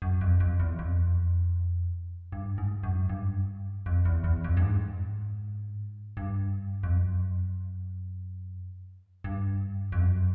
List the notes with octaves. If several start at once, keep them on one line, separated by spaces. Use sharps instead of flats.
F#2
F2
F2
E2
F2
G2
G#2
F#2
G2
F2
E2
E2
F2
G2
G#2
G2
F2
F#2
G2
F2
F#2